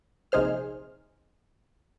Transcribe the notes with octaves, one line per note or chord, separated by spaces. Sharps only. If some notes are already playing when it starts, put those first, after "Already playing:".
A#1 C3 D#4 G#4 C5 F6